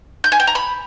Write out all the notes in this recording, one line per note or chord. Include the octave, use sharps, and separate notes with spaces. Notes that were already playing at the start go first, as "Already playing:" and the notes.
G6
G#5
G5
A#5
B5